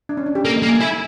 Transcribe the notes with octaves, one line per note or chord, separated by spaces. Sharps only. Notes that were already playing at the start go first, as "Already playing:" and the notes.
D4
C#4
D4
G4
A#3 A4
D#5
A#3
G#5
E4 G#5